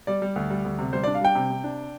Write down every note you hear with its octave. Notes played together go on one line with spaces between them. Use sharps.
G3 D5
G3
D2
G3
D2
C3
G3 C5
D4 D5
F5
G3 G5
C3
C3
D4